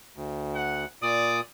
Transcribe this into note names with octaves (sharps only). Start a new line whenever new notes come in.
D2
F#5
A#2 D5 D#6